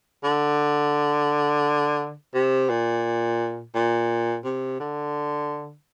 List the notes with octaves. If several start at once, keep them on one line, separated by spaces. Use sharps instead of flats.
D3
C3
A#2
A#2
C3
D3